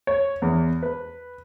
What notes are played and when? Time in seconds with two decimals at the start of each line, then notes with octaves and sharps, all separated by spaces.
0.07 C#5
0.42 E2
0.83 B4